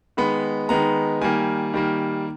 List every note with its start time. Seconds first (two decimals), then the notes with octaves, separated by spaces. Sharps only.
0.17 D#3 G#3 B3 B5
0.69 D#3 G#3 B3 A#5
1.21 D#3 G3 A#3 G#5
1.74 D#3 G3 A#3